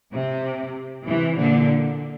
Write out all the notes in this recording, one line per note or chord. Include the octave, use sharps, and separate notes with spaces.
C3
C3 E3
A#2 D3